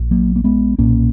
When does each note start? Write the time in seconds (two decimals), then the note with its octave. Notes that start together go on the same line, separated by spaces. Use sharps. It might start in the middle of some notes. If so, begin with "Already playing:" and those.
Already playing: A#1
0.11 F#3 A#3
0.36 A#3
0.44 G#3 B3
0.78 B1 A#2 A#3 C#4